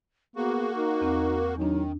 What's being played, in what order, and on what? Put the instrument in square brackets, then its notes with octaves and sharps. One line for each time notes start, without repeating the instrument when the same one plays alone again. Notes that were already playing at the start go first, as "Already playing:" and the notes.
[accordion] A#3 F#4 [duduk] B3 [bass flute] G#4
[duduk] D#4 [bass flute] A#4
[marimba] E2 C4
[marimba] E2 D4 [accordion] D#3 [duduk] F#3 [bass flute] D#4